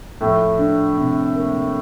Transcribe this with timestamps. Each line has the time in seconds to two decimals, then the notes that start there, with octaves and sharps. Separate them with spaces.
0.21 A2 F3 A3
0.59 D4
0.97 C3
1.35 A#3